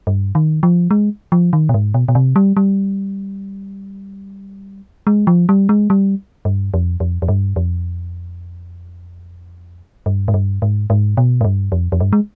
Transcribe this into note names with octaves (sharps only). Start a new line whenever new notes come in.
G2
D#3
F3
G#3
F3
D#3
B2
G#2
B2
B2
C3
G3
G3
G#3
F3
G3
G#3
G3
G2
F2
F2
F2
G2
F2
G2
G#2
G2
G#2
G#2
B2
G#2
G2
F2
F2
G2
G#3